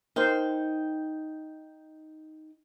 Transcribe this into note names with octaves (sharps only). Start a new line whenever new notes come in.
D#4 A#4 C5 G5